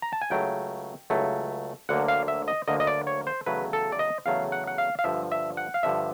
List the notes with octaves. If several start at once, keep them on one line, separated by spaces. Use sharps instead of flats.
A#5
A5
G#5
C#2 C#3 F#3 A3 G5
C#2 C#3 F#3 A3
D2 D3 F#3 A#3 F#5
F5
E5
D#5
D2 D3 F#3 A#3 D#5
D#5
D5
C#5
C5
E2 C#3 F#3 A3 B4
A4
D5
D#5
E2 C#3 F#3 A3 F5
F#5
F#5
F5
F5
G2 D3 F3 E5
E5
F#5
F5
G2 D3 F3 E5